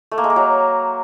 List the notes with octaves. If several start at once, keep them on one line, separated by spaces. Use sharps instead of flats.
A3
A#3
G#3
A#3
F#3